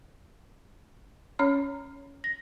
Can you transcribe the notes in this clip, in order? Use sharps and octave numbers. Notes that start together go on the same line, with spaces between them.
C#4 C#5 A#5 F6
A#6